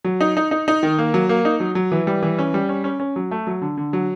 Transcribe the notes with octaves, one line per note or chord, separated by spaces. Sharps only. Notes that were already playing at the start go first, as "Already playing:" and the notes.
F#3
D#4
D#4
D#4
D#4
D#3
A#3
F#3
A#3
D#4
F#3
F#3
E3
G3
E3
C#4
G3
C#4
C#4
C#4
F#3
A3
F#3
D3
D3
F#3